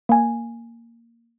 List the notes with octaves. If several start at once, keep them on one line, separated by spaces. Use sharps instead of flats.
A#3 G#5